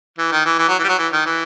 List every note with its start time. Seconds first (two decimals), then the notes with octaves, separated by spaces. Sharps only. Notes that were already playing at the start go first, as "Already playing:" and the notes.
0.18 E3
0.32 D#3
0.46 E3
0.59 E3
0.68 F#3
0.79 E3
0.84 G3
0.89 F#3
0.98 E3
1.13 D#3
1.26 E3